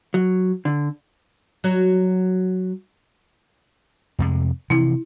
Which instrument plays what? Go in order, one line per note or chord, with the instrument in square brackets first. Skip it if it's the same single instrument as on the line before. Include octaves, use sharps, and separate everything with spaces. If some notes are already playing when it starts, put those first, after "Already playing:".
[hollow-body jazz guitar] F#3
D3
[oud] F#3 F#4 C#5
[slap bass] F2 C3 G#3
[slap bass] C3 E3 F3 [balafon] E4